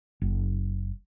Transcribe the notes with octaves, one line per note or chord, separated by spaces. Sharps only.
F#1